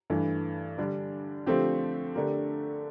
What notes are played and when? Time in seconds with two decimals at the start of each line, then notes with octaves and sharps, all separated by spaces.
0.10 G2 E3 A3
0.78 D3 G3 D4
1.46 D3 F3 A3 C4 G4
2.15 D3 A3 D4 G4 A#4